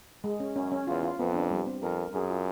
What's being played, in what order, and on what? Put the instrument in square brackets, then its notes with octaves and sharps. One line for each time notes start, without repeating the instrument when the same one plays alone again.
[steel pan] G#3
C#4
[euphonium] F#2 [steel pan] C#4
[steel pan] C#4
[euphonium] E2 [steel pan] F4
[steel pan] F4
[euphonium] F2 [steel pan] B3
[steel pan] D4
G3
C4
[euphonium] F2 [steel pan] A#4
[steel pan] A#4
[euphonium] F#2 [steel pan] G#4
[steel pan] F4